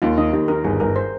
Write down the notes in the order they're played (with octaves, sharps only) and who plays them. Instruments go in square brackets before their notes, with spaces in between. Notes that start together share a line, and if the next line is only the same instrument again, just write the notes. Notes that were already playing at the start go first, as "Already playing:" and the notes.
[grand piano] D#2 [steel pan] F4
[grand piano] D#3 [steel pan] D#5
[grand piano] D#2 [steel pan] G4
[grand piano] D#3 [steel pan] A#4
[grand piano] G1 [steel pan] G#4
[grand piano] G1 [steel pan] A#4
[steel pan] C5